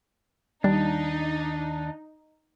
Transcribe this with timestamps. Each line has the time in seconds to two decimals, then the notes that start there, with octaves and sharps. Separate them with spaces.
0.64 D#2 G3 D4 D#4